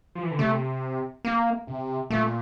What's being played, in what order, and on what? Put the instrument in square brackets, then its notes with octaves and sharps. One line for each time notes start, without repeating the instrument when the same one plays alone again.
[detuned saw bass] F3
E3
D3
[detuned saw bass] C3 [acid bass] A3
[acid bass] A#3
[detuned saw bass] C3
[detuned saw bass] A#2 [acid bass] A3